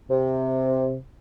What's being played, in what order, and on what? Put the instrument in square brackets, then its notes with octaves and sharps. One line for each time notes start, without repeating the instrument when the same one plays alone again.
[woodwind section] C3